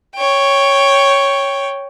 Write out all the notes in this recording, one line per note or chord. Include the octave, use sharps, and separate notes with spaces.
C#5 G5